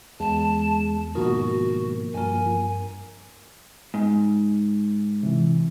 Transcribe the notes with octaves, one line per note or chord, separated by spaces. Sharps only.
E2 G#3 A5
G#2 B2 D#3 F3 A#3 F#4
G2 A#4 G#5
G#2
C3 E3